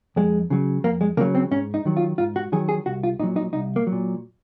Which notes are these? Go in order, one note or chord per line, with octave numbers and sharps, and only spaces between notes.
F2 G#3
C#3 F#3
F2 A#3
G#3
C#3 F#3 A#3
C4
G#2 C#4
D#4
D#3 F#3
F4
G#2 F4
F#4
D#3 F#3 G#4
G#4
C2 F#4
F4
A#2 F#3 D#4
D#4
C2 D#4
A#3
F#3
A#2